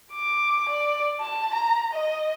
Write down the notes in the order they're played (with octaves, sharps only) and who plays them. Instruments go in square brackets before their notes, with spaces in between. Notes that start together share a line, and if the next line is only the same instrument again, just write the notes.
[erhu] D6
D5
A5
A#5
D#5